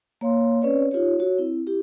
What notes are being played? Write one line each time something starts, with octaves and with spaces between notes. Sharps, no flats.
A#3 C#5 F5 C6
C4 C#4 B4 C#5 D5
D#4 F4 G4 C#5
F#4 C#5
C4 E4
E4 G4